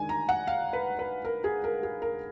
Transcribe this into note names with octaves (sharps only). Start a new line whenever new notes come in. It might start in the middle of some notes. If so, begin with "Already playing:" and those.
Already playing: D#3 G#3 D4 G#5
A#5
F#5
F5
B4
B4
A#4
G#4
A#4
G#4
A#4